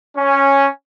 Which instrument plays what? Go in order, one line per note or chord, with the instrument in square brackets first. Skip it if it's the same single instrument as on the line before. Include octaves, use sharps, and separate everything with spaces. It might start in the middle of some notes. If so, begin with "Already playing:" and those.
[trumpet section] C#4